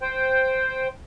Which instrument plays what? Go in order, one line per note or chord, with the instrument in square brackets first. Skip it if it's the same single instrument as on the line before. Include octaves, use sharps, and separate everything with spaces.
[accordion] C5 G5